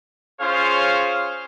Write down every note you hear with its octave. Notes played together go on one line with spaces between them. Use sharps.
C#4 F4 G#4 C5 C#5 F5